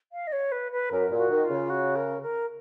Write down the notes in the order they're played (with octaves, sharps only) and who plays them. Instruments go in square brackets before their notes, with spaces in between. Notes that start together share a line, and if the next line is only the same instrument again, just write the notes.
[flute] F5
D#5
C#5
B4
B4
[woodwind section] F#2 [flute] A#4
[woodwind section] A#2
[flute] F#4
[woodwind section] D#3
[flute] F4
[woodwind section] C#3
[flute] F#4
A#4
A#4